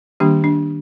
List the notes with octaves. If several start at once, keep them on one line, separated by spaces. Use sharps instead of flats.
D#3 G3 A#3 D4 G4
D4